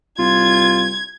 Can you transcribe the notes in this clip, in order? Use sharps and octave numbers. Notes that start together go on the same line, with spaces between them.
C2 F4 G#6